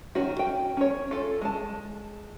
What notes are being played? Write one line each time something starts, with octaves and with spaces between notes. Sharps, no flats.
D#3 C#4 F#4
G5
C#4 C#5
F4 A4
G#3 A5